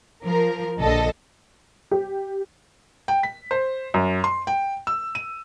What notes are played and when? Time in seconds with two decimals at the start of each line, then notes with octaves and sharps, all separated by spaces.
0.23 F3 A#4
0.80 A#1 D3 A4 D#5
1.91 G4
3.08 G5
3.23 B6
3.51 C5
3.94 F#2
4.24 C6
4.47 G5
4.87 E6
5.15 D#7